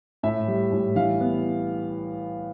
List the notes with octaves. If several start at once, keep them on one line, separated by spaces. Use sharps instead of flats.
A2 E5
G3
A2
E3 F5
B3